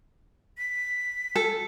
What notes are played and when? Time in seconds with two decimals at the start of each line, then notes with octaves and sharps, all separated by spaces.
0.58 B6
1.36 A4